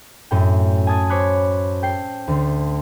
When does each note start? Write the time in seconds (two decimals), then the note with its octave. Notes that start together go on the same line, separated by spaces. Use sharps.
0.31 F#2 A2 G5
0.87 G#5 A5 D#6 G#6 A6
1.10 C5 C#5 B5 D6 F#6
1.82 A4 G5 C7
2.28 D2 D3 C6